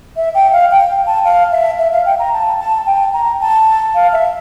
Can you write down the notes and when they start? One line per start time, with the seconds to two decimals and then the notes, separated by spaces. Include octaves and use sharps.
0.17 E5
0.35 G5
0.53 F5
0.71 G5
1.07 A5
1.24 F5
1.52 E5
1.79 E5
1.92 F5
2.06 G5
2.19 A#5
2.33 A5
2.60 A5
2.87 G5
3.13 A#5
3.41 A5
3.95 F5
4.13 E5